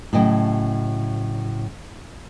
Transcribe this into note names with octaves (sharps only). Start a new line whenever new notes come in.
A2 C#3 F#3 D#5 G5